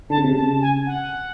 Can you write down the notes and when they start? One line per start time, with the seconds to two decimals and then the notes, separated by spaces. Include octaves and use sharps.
0.10 D3 A5
0.17 C#3
0.24 C3
0.31 C#3 A5
0.62 G#5
0.87 F#5